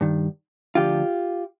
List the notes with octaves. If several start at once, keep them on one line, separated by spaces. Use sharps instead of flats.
G2 D#3
D2 D3 F3 F4 G4